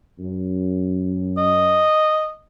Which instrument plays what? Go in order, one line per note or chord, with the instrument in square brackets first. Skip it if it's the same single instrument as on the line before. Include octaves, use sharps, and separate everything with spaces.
[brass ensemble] F#2
[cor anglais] D#5